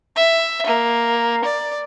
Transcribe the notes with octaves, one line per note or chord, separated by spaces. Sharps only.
E5
A#3
D5